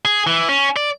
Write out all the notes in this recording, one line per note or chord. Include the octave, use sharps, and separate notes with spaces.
G#4
E3
C#4
D5